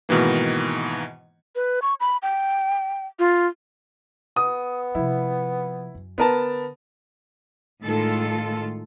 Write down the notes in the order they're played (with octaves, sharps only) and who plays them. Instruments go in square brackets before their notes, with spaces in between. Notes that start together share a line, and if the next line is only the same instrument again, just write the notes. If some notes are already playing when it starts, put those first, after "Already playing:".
[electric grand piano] G#2 B2 D#3 E3 A#3
[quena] B4
C#6
B5
G5
F4
[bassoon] B3 [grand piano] D#6
[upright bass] C3 F3 [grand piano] E4
[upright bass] F#2
[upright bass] D3 [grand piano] B3 A#4 A5
[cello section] A2 D#3 G#3 F4 A4